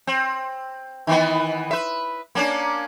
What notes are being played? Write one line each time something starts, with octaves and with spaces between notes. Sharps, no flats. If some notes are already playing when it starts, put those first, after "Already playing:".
C4
D#3 E3 B3
B4 E5
A#3 C#4 D4